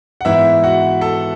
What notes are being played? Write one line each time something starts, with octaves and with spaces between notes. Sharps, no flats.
F#5
G#2 E3 B3 E4 E5
F#4 F#5
A4 A5